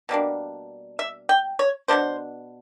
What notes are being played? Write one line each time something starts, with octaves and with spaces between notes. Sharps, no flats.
B2 G3 A#3 D4
E5
G5
C#5
B2 G#3 B3 D4 C5